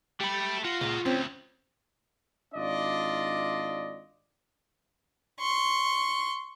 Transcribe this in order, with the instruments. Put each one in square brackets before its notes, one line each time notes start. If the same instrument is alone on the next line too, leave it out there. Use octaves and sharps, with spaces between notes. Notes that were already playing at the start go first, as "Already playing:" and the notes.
[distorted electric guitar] A3 [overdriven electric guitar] G4 B5
[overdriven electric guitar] F4 [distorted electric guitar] F#4
[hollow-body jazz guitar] C#2 A#2 [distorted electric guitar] F#4 D#5
[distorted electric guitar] D2 [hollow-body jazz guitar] C4 C#4
[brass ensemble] G#1 D4 F4 D5 D#5
[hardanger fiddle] C6 C#6